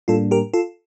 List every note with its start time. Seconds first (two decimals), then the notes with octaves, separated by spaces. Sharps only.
0.08 A2 G3 A#3 D4 F4 A4
0.31 G4 A#4
0.54 F4 A4